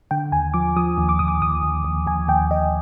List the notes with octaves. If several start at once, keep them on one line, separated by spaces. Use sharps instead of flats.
D3 G5
D#2 G#5
F3 D6
F3 D#6
D#2
D6
D#2 D#6
D6
D#2 D#6
D#2
D#2
D#2 G#5
D#2 G5
D#2 D#5